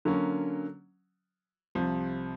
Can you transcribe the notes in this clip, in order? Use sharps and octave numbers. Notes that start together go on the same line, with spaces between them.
D3 F#3 A#3 C#4
C2 C3 F3